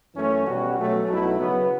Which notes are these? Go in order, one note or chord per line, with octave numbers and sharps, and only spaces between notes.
F#2 E3 A3 C#4
B2 G3 C#4 F#4
B2 F#3 A3 C#4
B1 B2 F#3 A3 E4
C#3 F#3 B3